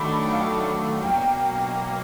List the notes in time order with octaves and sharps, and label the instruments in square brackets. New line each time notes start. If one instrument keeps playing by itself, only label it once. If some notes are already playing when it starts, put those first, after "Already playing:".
Already playing: [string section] D#3 F#3 A3 D4 [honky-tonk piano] B5
[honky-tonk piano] F5
[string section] B2 F#3 A#3 [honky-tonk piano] G5